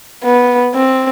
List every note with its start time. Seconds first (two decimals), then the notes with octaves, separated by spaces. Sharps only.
0.24 B3
0.75 C4